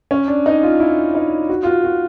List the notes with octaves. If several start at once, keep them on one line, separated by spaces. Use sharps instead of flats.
C#4
D4
D#4
F4
E4
D#4
F#4
F4
F#4
F#4